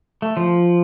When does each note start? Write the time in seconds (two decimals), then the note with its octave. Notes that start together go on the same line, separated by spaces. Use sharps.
0.22 A3
0.37 F3